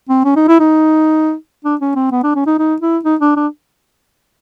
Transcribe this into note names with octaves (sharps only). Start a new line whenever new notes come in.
C4
C#4
D#4
E4
D#4
D4
C#4
C4
B3
D4
C#4
D#4
D#4
E4
D#4
D4
D4